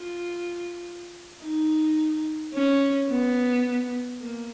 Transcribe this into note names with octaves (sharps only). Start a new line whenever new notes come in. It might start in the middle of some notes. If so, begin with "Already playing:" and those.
Already playing: F4
D#4
C#4
B3
A#3